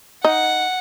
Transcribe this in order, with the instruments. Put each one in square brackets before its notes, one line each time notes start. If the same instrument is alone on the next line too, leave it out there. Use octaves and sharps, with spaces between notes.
[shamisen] D#4 [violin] F#5